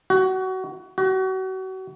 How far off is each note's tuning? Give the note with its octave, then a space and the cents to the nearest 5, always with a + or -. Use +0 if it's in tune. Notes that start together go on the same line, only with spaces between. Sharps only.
F#4 +25
F#4 +35